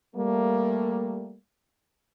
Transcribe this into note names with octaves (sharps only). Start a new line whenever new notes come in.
G3 A3 A#3